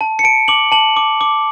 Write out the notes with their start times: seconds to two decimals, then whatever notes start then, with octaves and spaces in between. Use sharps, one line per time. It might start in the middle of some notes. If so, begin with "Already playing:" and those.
0.01 A5
0.19 C#7
0.24 A5 D7
0.48 D6 F#7
0.72 A5 F#7
0.97 D6
1.21 D6